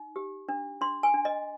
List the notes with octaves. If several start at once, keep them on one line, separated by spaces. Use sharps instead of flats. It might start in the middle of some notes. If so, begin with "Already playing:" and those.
Already playing: D#4
G4
D4
D4 C6
G#5
D4
D#5